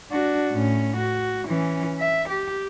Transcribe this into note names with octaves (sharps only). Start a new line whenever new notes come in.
D4 F#4
A2 C#4
F#4
E3 C#4
E5
G4